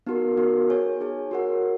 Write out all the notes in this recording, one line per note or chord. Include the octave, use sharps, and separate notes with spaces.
B3 D#4 F#4 A#4
B3 D#4 F#4 A#4
D#4 G#4 C#5 G#5
D#4 G#4 C#5 G#5
F#4 A#4 C#5 F#5
F#4